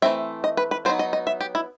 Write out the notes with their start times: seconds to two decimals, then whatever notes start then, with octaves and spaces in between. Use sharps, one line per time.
0.02 E3 A3 C4 E5
0.44 D#5
0.57 B4
0.71 B4
0.85 F#3 B3 D#4 C5
0.99 D#5
1.13 D#5
1.27 E5
1.41 G4
1.55 E4